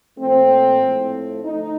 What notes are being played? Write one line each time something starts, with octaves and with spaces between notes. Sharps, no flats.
A#2 F3 A3 C4
A2 F3 A3
D3 A3 D#4